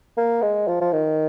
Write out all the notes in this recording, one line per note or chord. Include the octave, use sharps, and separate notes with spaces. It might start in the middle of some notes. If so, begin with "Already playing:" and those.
A#3
G#3
F3
F3
D#3